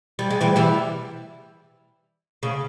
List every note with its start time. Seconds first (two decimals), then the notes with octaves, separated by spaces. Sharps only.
0.19 G3
0.30 G#3
0.41 E3 G3
0.56 E3 G3
2.43 C#3